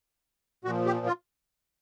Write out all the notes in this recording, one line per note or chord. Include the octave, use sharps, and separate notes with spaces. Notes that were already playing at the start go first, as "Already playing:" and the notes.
A#2 F3 F#4
G4
F4